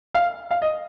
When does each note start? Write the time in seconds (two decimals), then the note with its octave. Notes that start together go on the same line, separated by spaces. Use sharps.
0.14 F5
0.51 F5
0.62 D#5